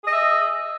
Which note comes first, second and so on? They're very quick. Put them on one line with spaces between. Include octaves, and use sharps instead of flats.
G#4 D#5 E5